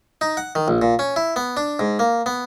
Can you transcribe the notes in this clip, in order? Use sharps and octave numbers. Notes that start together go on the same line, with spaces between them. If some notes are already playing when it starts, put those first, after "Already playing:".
D#4
F#5
D#3
A#1
A#2
C#4
E4
B3
D4
G#2
A#3
B3